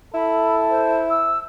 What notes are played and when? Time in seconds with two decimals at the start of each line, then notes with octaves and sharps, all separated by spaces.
0.14 E4 A4 B5
0.70 C5
1.10 E6